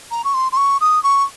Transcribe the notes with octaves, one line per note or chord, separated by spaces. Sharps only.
A#5
C#6
C6
C6
C#6
D#6
C#6